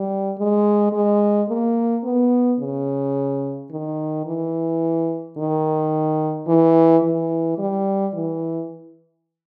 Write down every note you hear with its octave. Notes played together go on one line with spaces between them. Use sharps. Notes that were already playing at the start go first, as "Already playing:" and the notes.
Already playing: G3
G#3
G#3
A#3
B3
C#3
D#3
E3
D#3
E3
E3
G3
E3